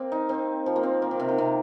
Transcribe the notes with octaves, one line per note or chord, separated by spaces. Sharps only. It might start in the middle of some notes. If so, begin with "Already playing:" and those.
Already playing: A#3 C4
D#4
C4
F3
A#3
C4
A#3
D#3
C3
D#3
C3